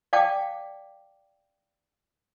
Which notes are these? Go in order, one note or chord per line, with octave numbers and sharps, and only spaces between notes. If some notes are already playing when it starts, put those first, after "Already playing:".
D5 F5 G5 A5 D6